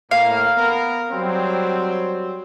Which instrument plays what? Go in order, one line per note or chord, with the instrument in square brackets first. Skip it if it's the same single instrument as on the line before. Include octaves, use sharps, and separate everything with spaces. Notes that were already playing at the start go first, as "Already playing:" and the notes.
[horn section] A2 A#3 [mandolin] F5
[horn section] B3 A#4
F#3 G3 C4